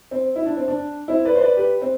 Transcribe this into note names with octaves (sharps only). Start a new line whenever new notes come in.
C4
E4
D4
C4
D4
C4 E4
B4 D5
C5
B4 D5
G4 B4
C4